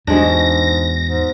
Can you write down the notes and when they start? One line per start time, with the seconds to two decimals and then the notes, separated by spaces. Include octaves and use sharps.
0.07 E2 G#2 B2 G#3 D4 A#6
1.07 G#2 A#6